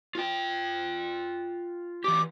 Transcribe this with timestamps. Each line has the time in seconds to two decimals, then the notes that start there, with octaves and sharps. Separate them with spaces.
0.15 F4 G5
2.04 E3 G4 D6